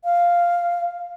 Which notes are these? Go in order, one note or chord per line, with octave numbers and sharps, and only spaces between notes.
F5